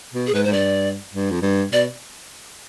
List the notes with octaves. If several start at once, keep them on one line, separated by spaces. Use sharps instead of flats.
B2
G#4
G#2 B4
G#2 C5
G2 D5
G2
F2
G2
B2 D5